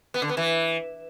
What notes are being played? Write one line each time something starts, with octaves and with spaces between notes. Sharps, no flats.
B3
D3
B3
E3